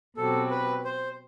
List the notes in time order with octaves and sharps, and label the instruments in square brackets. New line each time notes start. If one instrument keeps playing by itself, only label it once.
[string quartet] B2 F#3 C4 G4 [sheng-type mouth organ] A4
[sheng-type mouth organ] B4
C5